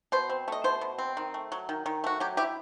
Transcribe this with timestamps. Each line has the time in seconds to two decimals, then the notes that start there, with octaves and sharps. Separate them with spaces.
0.12 B2 C5
0.29 C4
0.48 A3 D#5
0.64 B2 C5
0.81 B2
0.98 C4
1.17 D#3
1.34 A3
1.52 F#3
1.69 D#3
1.86 D#3
2.04 A3 F#4
2.20 F#3 G4
2.37 E4 G4